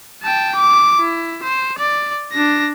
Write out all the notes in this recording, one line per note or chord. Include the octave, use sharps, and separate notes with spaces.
G5 A5
D6
E4
C5
D5
D4 A#6